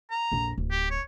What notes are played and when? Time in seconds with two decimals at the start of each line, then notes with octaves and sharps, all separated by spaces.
0.11 A#5
0.32 A#1 F2
0.57 D1
0.71 G4
0.91 C#5